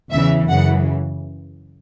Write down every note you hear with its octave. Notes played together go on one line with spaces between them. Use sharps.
E2 C#3 E3 E5
F#2 C#3 E3 F#5